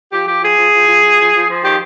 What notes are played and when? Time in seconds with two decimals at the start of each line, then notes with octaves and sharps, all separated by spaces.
0.11 F3 G4
0.27 F3 G4
0.42 F3 G#4
0.58 F3
0.73 F3
0.88 F3
1.03 F3
1.18 F3
1.34 F3
1.49 F3
1.63 D#3 G4